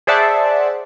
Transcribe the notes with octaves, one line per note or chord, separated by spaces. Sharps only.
G#4 C5 D5 E5 F#5 A5